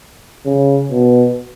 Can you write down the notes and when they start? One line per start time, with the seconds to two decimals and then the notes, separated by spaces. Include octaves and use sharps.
0.46 C#3
0.91 B2